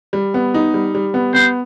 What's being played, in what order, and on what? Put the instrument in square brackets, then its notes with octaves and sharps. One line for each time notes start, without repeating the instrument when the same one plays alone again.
[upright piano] G3
B3
D#4
G3
G3
B3
[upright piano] B3 [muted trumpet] C5